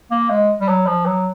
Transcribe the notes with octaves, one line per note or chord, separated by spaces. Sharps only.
A#3
G#3
G3
F#3
F3
F#3